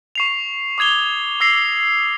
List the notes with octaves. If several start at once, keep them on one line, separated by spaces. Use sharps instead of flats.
C#6 C7 F7
D6 D#6 G#6 F7 G7
D6 E6 A#6 C7 F7